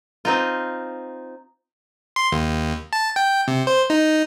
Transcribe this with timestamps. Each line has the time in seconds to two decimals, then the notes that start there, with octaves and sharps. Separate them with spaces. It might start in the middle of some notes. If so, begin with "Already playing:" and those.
0.25 C4 D#4 F4
2.16 C6
2.32 D#2
2.93 A5
3.16 G5
3.48 C3
3.67 C5
3.90 D#4